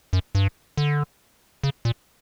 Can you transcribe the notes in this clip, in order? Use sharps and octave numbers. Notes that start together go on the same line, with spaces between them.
F#2
G2
D3
C#3
A#2